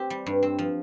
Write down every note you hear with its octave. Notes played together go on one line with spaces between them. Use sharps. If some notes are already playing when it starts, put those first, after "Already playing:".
Already playing: C4 G4
G3
G2
C4
F3